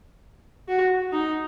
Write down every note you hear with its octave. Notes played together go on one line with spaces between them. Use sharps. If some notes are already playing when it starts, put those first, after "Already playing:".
F#4
D#4